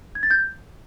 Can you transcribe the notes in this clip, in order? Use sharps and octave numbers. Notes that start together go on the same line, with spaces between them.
G#6
A6
G6